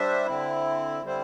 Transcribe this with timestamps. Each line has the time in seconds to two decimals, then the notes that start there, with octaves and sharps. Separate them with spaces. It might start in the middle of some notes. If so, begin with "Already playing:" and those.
Already playing: G3 D4 C5 E5
0.26 D3 C4 E4
1.04 D3 G3 C4 E4 C5